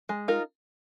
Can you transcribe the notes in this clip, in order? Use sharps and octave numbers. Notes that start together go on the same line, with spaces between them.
G#3
D#4 F4 A#4